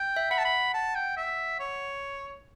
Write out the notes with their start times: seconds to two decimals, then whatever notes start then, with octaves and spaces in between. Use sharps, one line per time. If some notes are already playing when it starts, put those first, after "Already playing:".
Already playing: G5
0.16 E5
0.31 F#5 B5
0.39 A5
0.45 B5
0.74 A5
0.95 G5
1.17 E5
1.60 C#5